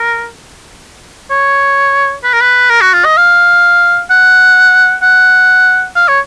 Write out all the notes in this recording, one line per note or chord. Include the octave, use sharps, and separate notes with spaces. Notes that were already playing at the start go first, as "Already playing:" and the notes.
Already playing: A#4
C#5
B4
A#4
B4
A#4
F#4
F4
D#5
F5
F#5
F#5
F5
C#5